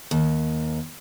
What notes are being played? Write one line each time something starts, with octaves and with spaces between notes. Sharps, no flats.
D#2